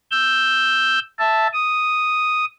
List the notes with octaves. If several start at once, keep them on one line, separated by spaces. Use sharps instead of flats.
E6 G6
E5 A5
D#6